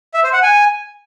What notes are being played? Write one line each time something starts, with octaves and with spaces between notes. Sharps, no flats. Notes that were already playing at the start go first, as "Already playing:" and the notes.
E5
C5
F#5
G#5